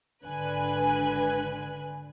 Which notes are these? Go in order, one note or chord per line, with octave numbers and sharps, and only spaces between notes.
G#1 D3 B4 G#5 F#6